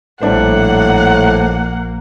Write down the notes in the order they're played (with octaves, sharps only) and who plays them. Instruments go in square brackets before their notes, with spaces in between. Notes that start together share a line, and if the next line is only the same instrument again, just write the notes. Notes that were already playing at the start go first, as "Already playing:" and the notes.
[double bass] A#1 A#3 [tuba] A2 [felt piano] G3 D4 C5 [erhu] F#5